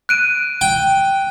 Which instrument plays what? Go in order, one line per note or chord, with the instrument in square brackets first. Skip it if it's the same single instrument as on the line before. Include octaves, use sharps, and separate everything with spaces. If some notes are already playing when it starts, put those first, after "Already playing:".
[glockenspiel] F#6 D7 D#7
[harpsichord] G5